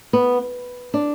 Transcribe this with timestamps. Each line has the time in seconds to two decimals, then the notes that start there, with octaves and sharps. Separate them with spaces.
0.13 B3
0.94 D4